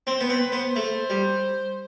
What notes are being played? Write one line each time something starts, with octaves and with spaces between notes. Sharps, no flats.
C4 C5
B3 C5
C4 B4
B3 C5
A3
G3